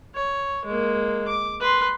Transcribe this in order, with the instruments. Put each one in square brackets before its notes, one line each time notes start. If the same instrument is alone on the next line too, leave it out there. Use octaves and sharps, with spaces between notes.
[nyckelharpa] C#5
G#3 A#3
D6
B4 C6